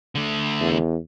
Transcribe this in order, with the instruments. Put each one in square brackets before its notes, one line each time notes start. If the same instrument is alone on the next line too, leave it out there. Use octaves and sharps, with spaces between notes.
[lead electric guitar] D3 A3
[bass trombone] E2